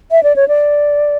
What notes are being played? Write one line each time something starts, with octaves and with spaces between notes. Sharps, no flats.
E5
D5
C#5
D5